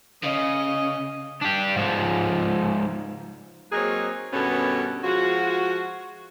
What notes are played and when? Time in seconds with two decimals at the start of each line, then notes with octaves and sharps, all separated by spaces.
0.23 C#3 D#5
1.41 D4 G4
1.76 G#2 F3
3.72 F#3 A#3 C4 D#4 G#4 C#5
4.33 G2 B2 D#3 B3 C#4 A4
5.04 F3 G#3 F4 F#4